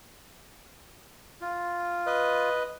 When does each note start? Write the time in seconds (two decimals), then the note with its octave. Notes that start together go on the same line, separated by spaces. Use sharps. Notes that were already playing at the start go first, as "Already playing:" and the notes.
1.41 F4
2.06 B4 D#5